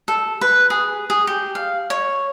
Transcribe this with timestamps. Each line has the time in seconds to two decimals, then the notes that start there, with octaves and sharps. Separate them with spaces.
0.08 A4
0.41 B4
0.70 G#4
1.10 G#4
1.27 G4
1.55 F5
1.90 C#5